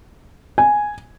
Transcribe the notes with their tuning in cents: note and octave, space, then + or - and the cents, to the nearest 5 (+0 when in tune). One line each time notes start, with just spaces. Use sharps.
G#5 +0